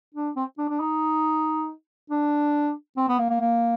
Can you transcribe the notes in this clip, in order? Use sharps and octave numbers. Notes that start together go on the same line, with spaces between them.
D4
C4
D4
D4
D#4
D4
C4
B3
A#3
A#3
A#3